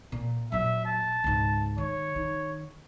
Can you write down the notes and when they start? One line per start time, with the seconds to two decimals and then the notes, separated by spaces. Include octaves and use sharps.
0.12 A#2
0.52 A#2 F#3 E5
0.85 A5
1.24 C#2 G#2
1.78 D#3 C#5
2.16 D#3